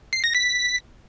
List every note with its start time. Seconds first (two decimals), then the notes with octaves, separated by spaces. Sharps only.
0.13 C7
0.24 A#6
0.35 B6